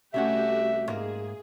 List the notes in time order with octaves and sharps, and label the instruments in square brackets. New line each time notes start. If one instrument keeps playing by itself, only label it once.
[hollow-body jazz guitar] C2 C#4 F#5 [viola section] A3 F#4 G4 [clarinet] E5
[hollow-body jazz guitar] G#2 A#3 [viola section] G#4